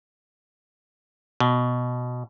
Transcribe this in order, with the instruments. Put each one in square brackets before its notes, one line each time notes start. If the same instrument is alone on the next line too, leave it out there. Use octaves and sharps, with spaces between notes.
[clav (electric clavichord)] B2